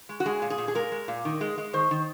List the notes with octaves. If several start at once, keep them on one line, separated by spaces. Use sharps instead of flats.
G#3
F#4
G#3 G#4
A#2
G#4
A#2
G#4
G#3 A#4
G#3
A#2
D#3
G#3
G#3
D#3 C5
D#3